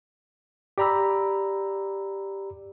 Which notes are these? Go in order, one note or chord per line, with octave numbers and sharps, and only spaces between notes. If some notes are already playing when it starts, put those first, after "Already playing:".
G4 D5 A#5 B5 E6